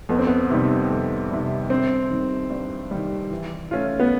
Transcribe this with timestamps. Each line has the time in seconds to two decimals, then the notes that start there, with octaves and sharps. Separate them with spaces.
0.09 F2 B3
0.19 C4
0.27 B3
0.50 C3 D#3 G3
0.90 F2
1.31 C3 D#3 G3
1.70 G2 C4
2.10 D#3 G3
2.50 G2
2.91 D#3 G3
3.31 E3
3.71 A3 C#4 F4
4.00 B3